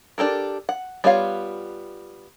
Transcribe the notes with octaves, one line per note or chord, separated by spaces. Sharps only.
D4 G4 A4 A#4
F#5
G3 B3 F4 C#5 F5